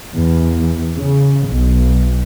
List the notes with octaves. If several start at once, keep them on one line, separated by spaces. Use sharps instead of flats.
E2
C#3
B1